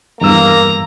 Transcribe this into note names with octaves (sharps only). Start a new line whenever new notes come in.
E2 G2 A#3 A#5 E6